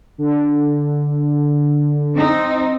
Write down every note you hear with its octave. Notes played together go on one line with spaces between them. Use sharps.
D3
C4 D#4